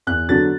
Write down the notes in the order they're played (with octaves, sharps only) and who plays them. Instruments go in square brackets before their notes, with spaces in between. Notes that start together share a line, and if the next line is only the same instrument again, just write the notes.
[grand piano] E2 F#6
D3 F#3 B3 D4 A6